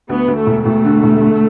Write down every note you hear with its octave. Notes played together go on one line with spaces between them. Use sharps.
D2 B3
D2
A3
E1
E1 A3
D3
E1
D3